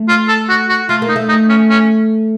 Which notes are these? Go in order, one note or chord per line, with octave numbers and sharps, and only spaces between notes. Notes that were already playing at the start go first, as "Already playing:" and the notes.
Already playing: A3
F4
A4
F#4
F#4
A3 F4
A#3
D#4
A3
D#4
C#4
C#4